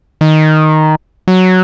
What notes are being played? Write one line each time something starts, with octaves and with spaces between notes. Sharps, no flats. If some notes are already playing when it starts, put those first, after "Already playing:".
D#3
F#3